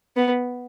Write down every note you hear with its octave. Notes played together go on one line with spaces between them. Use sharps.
B3